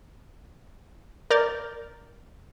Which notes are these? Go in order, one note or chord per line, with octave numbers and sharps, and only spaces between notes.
A#4 D5 F6 G6 A6